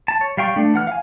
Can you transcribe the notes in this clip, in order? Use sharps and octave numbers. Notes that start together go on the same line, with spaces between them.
A5
C#5
G3 F5 G5 C#6
A3 D4
E3 F#5 F6
F5 G#5